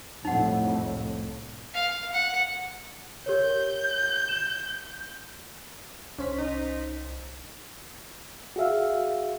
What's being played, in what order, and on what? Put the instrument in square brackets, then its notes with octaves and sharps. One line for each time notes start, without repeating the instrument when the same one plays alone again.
[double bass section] C2 F2 A2 [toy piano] D#4 F#5
[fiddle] F5
F#5
[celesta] G4 A#4 C#5 [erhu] G6
[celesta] E7
[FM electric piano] C2 C5 B6 [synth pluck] C#4
[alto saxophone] D#4
[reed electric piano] F#4 G#4 E5 F5